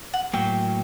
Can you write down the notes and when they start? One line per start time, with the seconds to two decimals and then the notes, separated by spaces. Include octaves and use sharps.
0.14 F#5
0.33 A2 F#3 A#3 G5